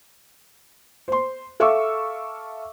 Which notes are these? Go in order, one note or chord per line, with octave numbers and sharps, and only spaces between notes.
C5 C6
A4 E5 F5 C#6 D6 E6